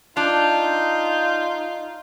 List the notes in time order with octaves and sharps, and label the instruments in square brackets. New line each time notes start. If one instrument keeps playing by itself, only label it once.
[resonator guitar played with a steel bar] D4 [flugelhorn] D#4 [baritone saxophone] F4 [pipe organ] G6